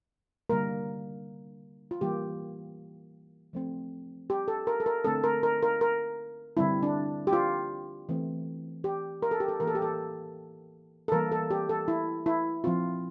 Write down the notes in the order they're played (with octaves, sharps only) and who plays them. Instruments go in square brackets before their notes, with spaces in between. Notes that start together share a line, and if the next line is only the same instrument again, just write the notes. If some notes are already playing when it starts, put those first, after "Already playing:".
[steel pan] D3 G3 A#3 A#4
F4
E3 G3 A#3 G4
F3 A3 C4
G4
A4
A#4
A4
A#4
D3 A3 C4 A4
A#4
A#4
A#4
A#4
D3 G3 C4 E4
D4
G4
F4
E3 A3 C4
G4
A#4
A4
G4
A4
E3 A#3 A#4
A4
G4
A4
A4
E3 G3 A#3 A#4
A4
G4
A4
E4
E4
F3 C4 F4